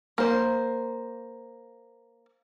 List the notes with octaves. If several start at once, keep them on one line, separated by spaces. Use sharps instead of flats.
A#3 C5